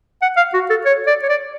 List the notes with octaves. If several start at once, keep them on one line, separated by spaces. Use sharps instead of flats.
F#5
F5
F#4
A4
C#5
D5
C#5
D5